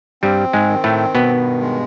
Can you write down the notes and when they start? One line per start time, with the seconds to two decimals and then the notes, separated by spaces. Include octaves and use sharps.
0.23 G2 G3 C4
0.53 G#2 G#3
0.69 D#3
0.84 A2 A3
1.15 G2 B2 B3
1.61 G#3